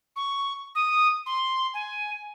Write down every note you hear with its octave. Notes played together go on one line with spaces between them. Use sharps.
C#6
D#6
C6
G#5